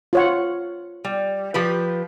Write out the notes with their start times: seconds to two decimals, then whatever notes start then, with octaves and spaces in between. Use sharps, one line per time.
0.13 F4 C#5 F#5
1.04 G3
1.54 F3 G4 B4